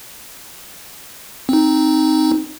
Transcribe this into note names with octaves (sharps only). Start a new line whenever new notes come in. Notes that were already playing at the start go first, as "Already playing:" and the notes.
C4 D#4